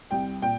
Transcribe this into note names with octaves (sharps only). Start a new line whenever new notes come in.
C2 G5
A#2 G5